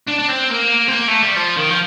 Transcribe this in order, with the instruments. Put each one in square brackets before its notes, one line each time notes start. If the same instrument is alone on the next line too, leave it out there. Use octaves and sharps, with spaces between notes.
[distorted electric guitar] D4
D4
C4
A#3
C4
A#3
A3
G3
F3
D#3
F3